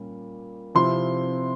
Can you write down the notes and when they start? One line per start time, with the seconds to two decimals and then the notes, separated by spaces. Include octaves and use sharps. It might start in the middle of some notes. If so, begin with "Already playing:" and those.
Already playing: A#2 G3 C#4
0.75 C3 F3 C4 E4 C6